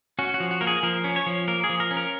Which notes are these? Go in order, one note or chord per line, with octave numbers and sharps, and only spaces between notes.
C#4 F#4
F#4
F3
F#4
A#3 A#4
G#4
F3 A#4
C#4
C#5
F3
A#3 A#4
G#4
F3
A#4
C#4
A#4